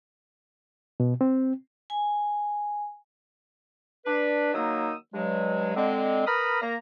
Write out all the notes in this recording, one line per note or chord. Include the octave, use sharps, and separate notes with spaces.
B2
C4
G#5
D4 B4
D#3 F#3 A#3 D#4 D#6 E6
G2 F#3 G#3
D3 G#3 C4
A#4 B4 A#5 B5 D#6 F6
A#3 A#5